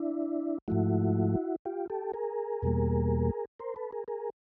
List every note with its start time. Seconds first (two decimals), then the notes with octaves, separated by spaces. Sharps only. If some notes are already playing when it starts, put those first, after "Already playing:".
Already playing: D4 E4
0.68 G#2 F3 A3 E4 F#4
1.65 F4 G4
1.90 G4 A4
2.13 G#4 A#4
2.62 E2 B2 G3 A#3
3.59 A#4 C5
3.76 A4 B4
3.92 G#4 A#4
4.08 G#4 A#4